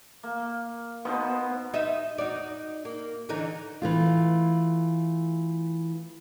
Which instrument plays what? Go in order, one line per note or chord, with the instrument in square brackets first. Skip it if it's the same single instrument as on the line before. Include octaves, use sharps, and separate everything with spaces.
[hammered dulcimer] A#3
[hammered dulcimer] B2 D#4 C5 [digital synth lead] B3
[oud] D#4 D#5 E5
D#4 F#4 D5
A#3
D3 E3 D#4
[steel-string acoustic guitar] E3 A3 F4